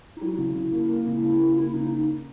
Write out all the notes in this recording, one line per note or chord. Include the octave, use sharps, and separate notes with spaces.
D#4
F#3 E4
C#3
C#3
A#3
A#3
C#3
C#3
A#3
A#3 E4
C#3 D#4